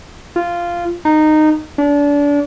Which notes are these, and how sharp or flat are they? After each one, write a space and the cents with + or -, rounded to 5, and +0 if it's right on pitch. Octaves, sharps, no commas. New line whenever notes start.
F4 -10
D#4 -15
D4 -30